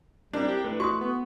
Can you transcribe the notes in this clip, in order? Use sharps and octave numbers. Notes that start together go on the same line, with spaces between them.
G3 C4 D4 E4 A#4
G4
A3 E4 B4
F#4 C6 C#6 D#6
B3